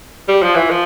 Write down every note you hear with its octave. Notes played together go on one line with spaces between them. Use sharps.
G3
F3
E3
F3